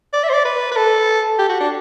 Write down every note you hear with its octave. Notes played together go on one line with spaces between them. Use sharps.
D5
E5
C5
D5
B4
B4
A4
G4
F#4
D4